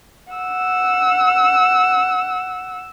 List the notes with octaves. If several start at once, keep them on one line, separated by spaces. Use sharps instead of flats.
F#5 E6